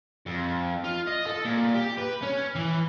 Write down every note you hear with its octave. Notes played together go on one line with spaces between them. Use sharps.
F2
F4
D#5
A4
A#2
G4
B4
C#4
E3